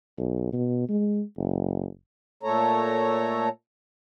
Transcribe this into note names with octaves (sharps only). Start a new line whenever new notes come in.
B1
B2
G#3
F#1
A#2 A3 A4 C#5 A#5